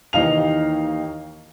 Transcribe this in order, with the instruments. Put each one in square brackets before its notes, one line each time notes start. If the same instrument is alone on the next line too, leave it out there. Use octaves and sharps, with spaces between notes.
[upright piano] D#2 E3 D#4 F5 F7